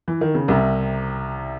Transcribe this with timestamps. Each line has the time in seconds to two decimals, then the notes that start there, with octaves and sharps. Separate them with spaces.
0.08 E3
0.21 D#3
0.35 C#3
0.48 C2 C3